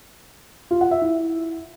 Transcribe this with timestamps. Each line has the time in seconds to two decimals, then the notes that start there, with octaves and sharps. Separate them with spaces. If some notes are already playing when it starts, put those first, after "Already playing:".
0.71 F4
0.81 F#5
0.91 E5
1.02 E4